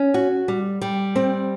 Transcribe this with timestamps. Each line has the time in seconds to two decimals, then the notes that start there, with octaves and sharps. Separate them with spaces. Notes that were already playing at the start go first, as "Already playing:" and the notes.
Already playing: C#4
0.14 F#4
0.48 G3
0.81 G3
1.15 C4